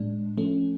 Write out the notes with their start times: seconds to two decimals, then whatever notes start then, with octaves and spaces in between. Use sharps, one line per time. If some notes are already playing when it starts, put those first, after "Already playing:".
Already playing: A2 G#3 D4
0.38 F3 A3 C#4